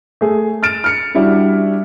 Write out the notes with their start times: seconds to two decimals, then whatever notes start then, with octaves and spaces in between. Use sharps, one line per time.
0.21 A3 G#4
0.63 F6 A6 D7 E7
0.84 F6 C#7
1.14 G3 D4 E4 F#4